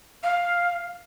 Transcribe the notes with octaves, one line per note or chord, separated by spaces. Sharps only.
F5